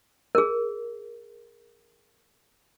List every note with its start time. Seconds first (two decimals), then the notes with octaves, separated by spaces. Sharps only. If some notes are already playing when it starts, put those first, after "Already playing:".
0.35 G#4 A#4